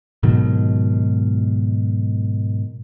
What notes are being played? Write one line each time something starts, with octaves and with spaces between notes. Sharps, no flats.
G#2 B2 D#3 F#3